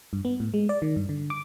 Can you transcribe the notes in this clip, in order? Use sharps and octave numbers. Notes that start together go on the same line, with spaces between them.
G2
B3
A2
G#3
D5
D#3
G2
D3
D6